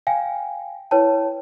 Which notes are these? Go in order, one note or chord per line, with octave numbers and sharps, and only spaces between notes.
F5 G5 G#5
E4 B4 C#5 G5 A5